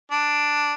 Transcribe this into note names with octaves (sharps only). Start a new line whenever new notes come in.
D4